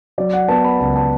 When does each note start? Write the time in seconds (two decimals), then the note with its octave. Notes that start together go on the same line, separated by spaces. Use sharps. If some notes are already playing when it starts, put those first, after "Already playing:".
0.18 F#3 D5
0.33 F#5
0.48 B3 A5
0.64 B5
0.80 C#2 A5
0.96 A5